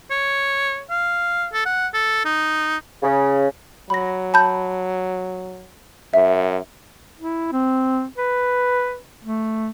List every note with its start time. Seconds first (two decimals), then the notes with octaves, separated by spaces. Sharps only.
0.11 C#5
0.90 F5
1.53 A4
1.65 F#5
1.94 A4
2.25 D#4
3.03 C#3
3.90 F#3 B5 A#6
4.34 A5 B5 G6
6.14 F#2 E5
7.20 E4
7.52 C4
8.18 B4
9.24 A3